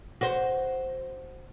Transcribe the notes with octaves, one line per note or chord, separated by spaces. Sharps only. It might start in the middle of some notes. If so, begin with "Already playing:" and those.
F#4 C5